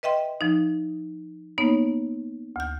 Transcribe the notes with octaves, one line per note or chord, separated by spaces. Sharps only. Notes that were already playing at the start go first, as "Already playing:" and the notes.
B4 D#5 E5 G5 C6
F3 D#4
A#3 B3 D#4 C#5
D2 G6